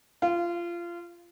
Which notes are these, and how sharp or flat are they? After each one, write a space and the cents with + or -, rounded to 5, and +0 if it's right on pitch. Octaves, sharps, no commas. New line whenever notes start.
F4 -20